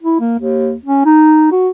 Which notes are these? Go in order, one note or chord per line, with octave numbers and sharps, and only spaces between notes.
E4
A#3
D#2
C#4
D#4
F#4